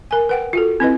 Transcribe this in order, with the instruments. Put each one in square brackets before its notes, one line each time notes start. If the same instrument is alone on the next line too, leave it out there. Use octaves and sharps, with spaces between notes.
[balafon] A#4 G#5
B4 F#5 G5
F4 F#4 A4
C4 E4 B4 D#5